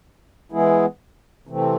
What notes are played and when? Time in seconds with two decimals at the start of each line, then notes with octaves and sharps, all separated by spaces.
0.52 E3 G#3 B3 E4 G#4
1.47 C3 E3 A3 C4